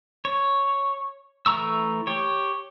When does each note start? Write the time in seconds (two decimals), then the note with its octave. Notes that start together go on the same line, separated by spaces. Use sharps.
0.25 C#5
1.46 E3 A3 A#5 C#6 E6
2.07 G4 C#5